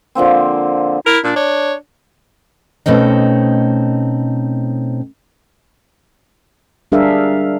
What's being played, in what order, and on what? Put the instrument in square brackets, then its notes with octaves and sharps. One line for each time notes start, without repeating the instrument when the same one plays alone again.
[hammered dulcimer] D3 F3 A#3 C4
[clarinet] E4 [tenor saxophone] A#4
[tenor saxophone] A#2 [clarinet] D4
[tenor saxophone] D4 [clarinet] C#5
[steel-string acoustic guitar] B2 A3 C4 C#4 D#4
[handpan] G3 D4 G#4 A#4 E5 F5